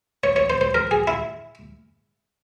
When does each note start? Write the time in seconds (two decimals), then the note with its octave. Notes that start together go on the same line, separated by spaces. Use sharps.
0.24 C#5
0.36 C#5
0.50 C5
0.61 C5
0.74 A#4
0.91 G#4
1.07 E4